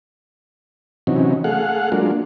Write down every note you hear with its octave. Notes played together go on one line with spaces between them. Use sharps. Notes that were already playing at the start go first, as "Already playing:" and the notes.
C3 E3 F#3 C#4 D#4
A3 G#4 F5 F#5
F#3 G#3 A#3 D4 F4